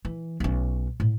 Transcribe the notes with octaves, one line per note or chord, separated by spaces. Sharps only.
E3
B1 C#4
A2